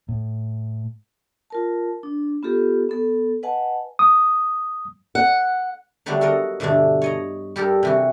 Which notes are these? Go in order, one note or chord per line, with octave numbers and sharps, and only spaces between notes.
A2
F4 A#4 A5
D4
B3 F4 G4 A4
B3 A4
B4 D#5 F#5 G#5 A5
D#6
F#5
D3 F#3 G3 A3 B3 D4
F#4 A4 A#4 D#5
G2 B2 D3 E3 A3 D4
C#5 D#5 A#5
G3 G4 A4 A#4
C3 E3 F#4